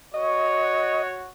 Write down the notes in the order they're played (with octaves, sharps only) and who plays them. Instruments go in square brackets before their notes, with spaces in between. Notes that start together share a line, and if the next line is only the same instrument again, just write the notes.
[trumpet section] F#4 C#5 [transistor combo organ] D#5